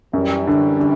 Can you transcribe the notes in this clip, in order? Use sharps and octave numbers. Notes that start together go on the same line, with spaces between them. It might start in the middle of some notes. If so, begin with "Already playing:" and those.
F#2 E3 G3
D3
D3